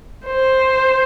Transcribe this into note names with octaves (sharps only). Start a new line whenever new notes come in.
C5